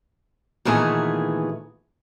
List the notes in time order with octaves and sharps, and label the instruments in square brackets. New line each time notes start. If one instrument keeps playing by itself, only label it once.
[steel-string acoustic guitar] A#2 D#3 E3 A3 B3 G#4